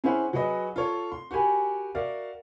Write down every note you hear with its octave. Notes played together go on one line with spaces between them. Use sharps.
C#4 E4 G#4 C5 F#5
F#3 F#4 G#4 B4 D#5
F4 A4 C#5
C6
F#4 G4 A#4 G#5 B5
F#4 A#4 D5 E5 F5